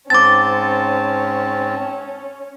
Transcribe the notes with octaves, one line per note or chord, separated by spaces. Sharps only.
G#2 C4 C#4 A5 D6 A6